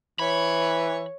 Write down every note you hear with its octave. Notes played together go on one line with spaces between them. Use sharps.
E3 C#5 B5